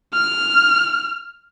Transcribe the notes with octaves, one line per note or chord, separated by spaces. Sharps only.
F6